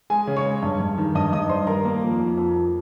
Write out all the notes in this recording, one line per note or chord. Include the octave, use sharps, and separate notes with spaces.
G#3 G#4 G#5
C#3
C#5 C#6
G#3
G2
G2
D#3
G2 D#5 D#6
G2 D#5 D#6
G3 C5 C6
D#3 A#4 A#5
A#3
F2
F2
F2
F2